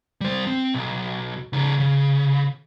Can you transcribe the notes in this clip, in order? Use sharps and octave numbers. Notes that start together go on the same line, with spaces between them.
G3 C5
C4
B1
C#3 D#4
C#3